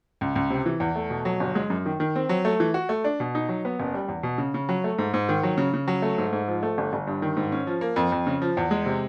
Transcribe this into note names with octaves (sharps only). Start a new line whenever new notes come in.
C#2
C#2
C3
E3
E2
A3
B2
F#3
G1
G#3
F#2
D#3
D#3
C4
F#3
A3
E3
F#4
A3
D4
B2
D#4
F#3
B3
F#1
G3
E2
B2
C#3
C#3
F#3
A3
G#2
G#2
D#3
F#3
C#3
C#3
F#3
A3
G#2
G#2
F3
A3
G1
G1
G2
D#3
G#2
C#4
F3
A#3
F2
F2
C#3
F3
E2
G#3
C3